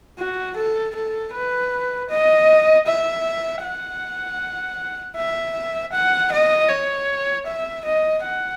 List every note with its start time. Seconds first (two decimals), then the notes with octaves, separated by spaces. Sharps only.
0.18 F#4
0.56 A4
0.95 A4
1.33 B4
2.10 D#5
2.87 E5
3.63 F#5
5.16 E5
5.92 F#5
6.32 D#5
6.69 C#5
7.47 E5
7.85 D#5
8.23 F#5